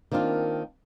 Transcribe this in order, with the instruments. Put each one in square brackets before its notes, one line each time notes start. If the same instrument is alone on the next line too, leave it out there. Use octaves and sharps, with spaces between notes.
[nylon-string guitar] D#3 A#3 C4 D4 F4